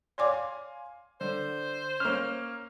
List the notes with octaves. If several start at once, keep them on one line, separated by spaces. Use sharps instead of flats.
C#5 D5 F5 G#5 C6 D6
D3 C5
A#3 C#4 F6